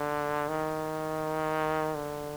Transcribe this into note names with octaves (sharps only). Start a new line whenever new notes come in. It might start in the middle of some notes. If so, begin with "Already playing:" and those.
Already playing: D3
D#3
D3